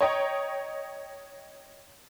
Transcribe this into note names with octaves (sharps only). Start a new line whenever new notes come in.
C#5 D#5 G5 A#5